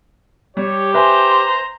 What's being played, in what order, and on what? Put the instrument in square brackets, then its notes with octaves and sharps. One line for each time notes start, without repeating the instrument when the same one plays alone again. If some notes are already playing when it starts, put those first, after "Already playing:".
[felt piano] G3 [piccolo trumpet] G4 [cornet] C#5
[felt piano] B4 E5 G#5 [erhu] C5 [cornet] A#5